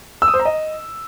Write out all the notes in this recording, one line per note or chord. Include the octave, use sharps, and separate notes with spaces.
E6
D#6
C5
A#5
D#5